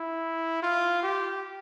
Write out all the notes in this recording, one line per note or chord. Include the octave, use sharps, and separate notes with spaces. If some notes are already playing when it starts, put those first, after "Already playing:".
Already playing: E4
F4
G4